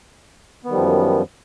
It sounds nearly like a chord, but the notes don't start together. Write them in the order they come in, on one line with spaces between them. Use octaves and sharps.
B3 D#3 G3 F3 F#2